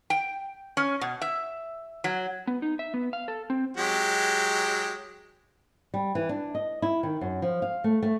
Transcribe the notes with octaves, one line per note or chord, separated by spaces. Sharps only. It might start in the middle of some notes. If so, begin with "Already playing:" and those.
G5
C#4
B2
E5
F#3
B3
D#4
E5
B3
F5
A4
C4
F#3 G#3 G4
G3
E3
D4
D#5
E4
D#3
F#2
F3
F5
A3
A3